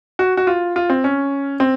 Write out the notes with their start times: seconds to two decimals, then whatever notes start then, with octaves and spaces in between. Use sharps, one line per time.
0.19 F#4
0.37 F#4
0.47 F4
0.76 F4
0.90 C4
1.04 C#4
1.60 C4